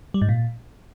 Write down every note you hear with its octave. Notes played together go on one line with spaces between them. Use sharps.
G3
G#2
A#2